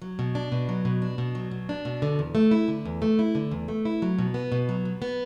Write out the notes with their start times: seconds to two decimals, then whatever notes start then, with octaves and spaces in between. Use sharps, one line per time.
0.02 F#3
0.19 B2
0.35 D4
0.52 B2
0.69 F#3
0.85 B2
1.02 D4
1.18 B2
1.35 F#3
1.51 B2
1.69 D4
1.85 B2
2.02 D3
2.19 E2
2.35 A3
2.51 E4
2.68 D3
2.85 E2
3.02 A3
3.19 E4
3.35 D3
3.51 E2
3.68 A3
3.85 E4
4.02 F#3
4.19 B2
4.34 B3
4.52 B2
4.69 F#3
4.85 B2
5.02 B3